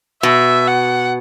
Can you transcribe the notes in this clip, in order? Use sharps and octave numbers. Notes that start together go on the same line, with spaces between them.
B2 E5
F#5